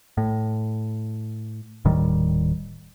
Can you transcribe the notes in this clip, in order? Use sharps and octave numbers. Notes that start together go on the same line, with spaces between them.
A2
D#1 A2 D#3 G3